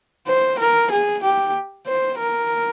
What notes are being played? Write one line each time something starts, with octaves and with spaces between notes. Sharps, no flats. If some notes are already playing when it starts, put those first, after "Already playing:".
C5
A#4
G#4
G4
C5
A#4